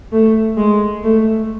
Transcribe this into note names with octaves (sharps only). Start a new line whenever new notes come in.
A3
G#3
A3